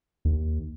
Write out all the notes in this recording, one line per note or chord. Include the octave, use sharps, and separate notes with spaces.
D#2